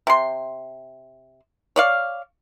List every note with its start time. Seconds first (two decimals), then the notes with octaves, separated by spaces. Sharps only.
0.07 C3 C6
1.76 C#5 D5 F5